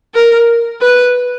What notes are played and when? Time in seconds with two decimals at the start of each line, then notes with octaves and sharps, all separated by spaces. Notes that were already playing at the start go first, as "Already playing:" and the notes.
0.14 A#4
0.81 B4